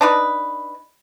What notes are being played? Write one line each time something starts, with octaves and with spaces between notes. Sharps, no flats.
D4 D#4 B4